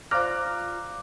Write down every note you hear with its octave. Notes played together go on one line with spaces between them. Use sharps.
F4 C5 D5 A#5 D6 F6 F#6